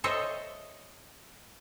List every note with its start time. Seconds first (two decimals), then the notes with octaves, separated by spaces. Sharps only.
0.04 A4 C5 C#5 D#5 E5